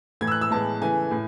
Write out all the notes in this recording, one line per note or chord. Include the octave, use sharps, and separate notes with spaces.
A2 E3 A3 G#6
E6
F#6
E6
A2 E3 G#3 B3 A5
C#3 E3 A3 G#5
A2